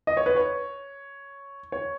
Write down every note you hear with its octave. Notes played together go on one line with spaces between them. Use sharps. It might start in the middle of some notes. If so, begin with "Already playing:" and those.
D#5
C#5
B4
C#5
C#5